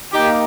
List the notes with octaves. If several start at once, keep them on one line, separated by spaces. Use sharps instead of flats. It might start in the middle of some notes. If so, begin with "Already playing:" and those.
A#3 D#4 G4